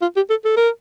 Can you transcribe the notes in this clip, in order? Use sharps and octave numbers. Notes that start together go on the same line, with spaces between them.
F4
G4
A4
A4
A#4